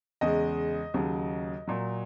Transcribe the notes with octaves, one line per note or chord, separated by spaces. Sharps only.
E2 C#3 G#3 D#5
D#2 C#3 F#3
A#2 F#3